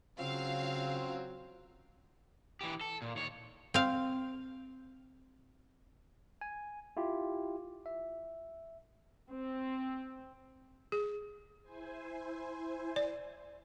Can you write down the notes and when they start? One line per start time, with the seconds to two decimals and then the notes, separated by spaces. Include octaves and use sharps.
0.19 C#3 F#3 C4 C#4 F4 F5 E6
2.61 E3 G4
2.81 A4
3.02 A#2
3.16 D#2 C#5
3.74 C4 F5
6.41 G#5
6.97 E4 F4 G4
7.86 E5
9.31 C4
10.92 G#4
11.62 E4 C5 G#5
12.96 D5